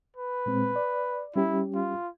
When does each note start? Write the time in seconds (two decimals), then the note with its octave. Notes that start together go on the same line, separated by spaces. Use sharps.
0.17 B4
0.46 A#2 G#3 C4
0.76 D5
1.36 G3 C#4 E4 G4
1.75 F4